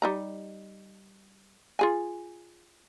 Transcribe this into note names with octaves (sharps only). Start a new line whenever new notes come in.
G3 D#4 A#5
F4 G#4 G#5